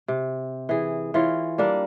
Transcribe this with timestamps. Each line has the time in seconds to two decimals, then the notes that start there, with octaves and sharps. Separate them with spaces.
0.08 C3
0.69 E3 G#4
1.14 E3 F4 C#5
1.58 G3 A#3 D4 A#4